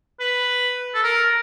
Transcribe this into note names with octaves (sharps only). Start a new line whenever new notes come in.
B4
A4
A#4